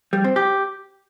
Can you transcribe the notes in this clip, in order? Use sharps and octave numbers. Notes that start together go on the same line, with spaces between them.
G3
C4
G4